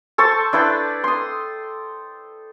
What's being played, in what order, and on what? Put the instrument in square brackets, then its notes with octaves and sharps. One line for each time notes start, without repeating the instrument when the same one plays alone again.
[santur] A4 C5 A5 C#6
D4 E4 B4 G5
C6 D#6